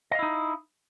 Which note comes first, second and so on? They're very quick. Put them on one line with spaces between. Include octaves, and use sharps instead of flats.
D#5 F5 E4 D#4